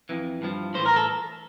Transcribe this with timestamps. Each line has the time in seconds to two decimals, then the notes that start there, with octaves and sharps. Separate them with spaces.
0.09 F2 E3
0.42 G2 F3
0.74 A2 E3 C5
0.86 A#4
0.96 A4